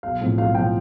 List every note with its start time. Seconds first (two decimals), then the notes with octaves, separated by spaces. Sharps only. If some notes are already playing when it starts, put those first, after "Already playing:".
0.03 B1 F5
0.21 A2 F3 C4
0.38 B1 F5
0.55 A2 F3 C4 G5